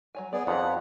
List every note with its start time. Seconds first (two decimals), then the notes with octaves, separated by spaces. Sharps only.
0.15 F#3 C#5 G#5
0.33 B3 G#4 C#5 D5
0.47 F2 F4 G4 C#5 F#5